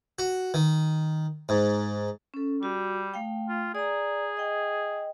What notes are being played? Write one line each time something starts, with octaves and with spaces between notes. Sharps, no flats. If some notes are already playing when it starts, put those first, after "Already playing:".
F#4
D#3
G#2
C#4 A4
G3 F#4
A3 F5 G5
F4
G#4 D5 A#5
D#5 G5